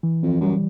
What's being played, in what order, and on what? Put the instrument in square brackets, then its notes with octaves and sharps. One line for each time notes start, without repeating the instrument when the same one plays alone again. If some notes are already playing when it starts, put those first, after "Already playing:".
[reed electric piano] E3
[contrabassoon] F2
[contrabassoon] F#2 [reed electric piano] G3